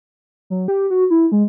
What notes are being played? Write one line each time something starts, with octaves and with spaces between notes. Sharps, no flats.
F#3
G4
F#4
E4
G#3